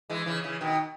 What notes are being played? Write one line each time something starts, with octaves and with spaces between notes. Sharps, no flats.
E3 G#3
C#3 E3
C#3 E3
B2 D#3